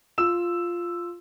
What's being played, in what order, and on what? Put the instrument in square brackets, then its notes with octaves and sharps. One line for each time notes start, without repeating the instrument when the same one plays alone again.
[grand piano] F4 E6 E7